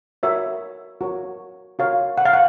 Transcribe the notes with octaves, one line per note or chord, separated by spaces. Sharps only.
F#4 A#4 C#5 E5
F#4 A#4 C#5
F#4 A#4 C#5 F5
F#5
F5
F#5